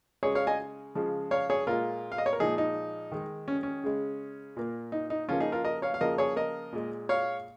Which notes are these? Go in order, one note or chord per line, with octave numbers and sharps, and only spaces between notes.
C#3 G#3 G#4 C#5
C#5 F5
D#5 G#5
C#3 F3 G#3
C#5 F5
G#4 C#5
A#2 G#3 F4 A#4
F5
D#5
C#5
A#4
A#2 F3 G#3 D#4 G#4
D#4
D#3 G#3
C#4
C#4
C#3 G#3
A#2 A#3
D#4
D#4
C#3 F3 A#3 C#4 F4
D#4 G#4
F4 A#4
A#4 D#5
C#5 F5
F5
C#3 F3 A#3 A#4 D#5
G#4 C#5
A#4 D#5
A#2 G#3
C#5 F5